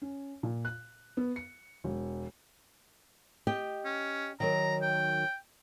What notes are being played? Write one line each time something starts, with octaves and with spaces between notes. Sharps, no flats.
C#4
A#2
F#6
B3
C#7
E1
G4 D#5 G5
C#4
D#3 F#3 A#4 A#5
G5